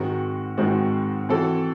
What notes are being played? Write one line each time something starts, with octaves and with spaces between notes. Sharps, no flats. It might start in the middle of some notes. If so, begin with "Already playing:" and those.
Already playing: G#2 D#3 G#3 C4 F#4
G#2 D#3 G#3 C4 F#4
E3 C4 F#4 A4